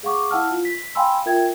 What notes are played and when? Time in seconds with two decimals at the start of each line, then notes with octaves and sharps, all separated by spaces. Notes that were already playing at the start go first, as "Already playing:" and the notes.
0.03 G#4 F5 F#5 C#6 D6
0.31 E4 F5 F#5 A5 E6 F6
0.51 F4
0.65 B6
0.95 F5 G5 G#5 B5 C6 E6
1.26 F4 A#4 E5 G5 G#6